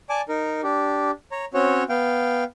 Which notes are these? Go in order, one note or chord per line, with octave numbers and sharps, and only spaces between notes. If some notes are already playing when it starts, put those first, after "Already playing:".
D5 G#5 A5 D6
D#4 A#4
D4 G4
C#5 A#5
C4 C#4 F#4 C#5
B3 F5 G5